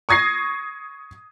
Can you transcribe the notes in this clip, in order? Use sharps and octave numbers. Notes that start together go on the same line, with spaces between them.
C#6 D#6 G#6 A#6 C7